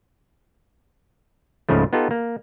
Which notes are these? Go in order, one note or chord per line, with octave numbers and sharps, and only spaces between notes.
C#2 G#2 C#3 F3 A3
B3 D#4 F4 G4 A4
A#3